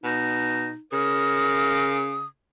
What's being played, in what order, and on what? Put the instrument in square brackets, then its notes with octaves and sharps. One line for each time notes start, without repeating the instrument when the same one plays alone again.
[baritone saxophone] B2 [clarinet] D#4
[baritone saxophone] C#3 [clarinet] A#4 [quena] D#6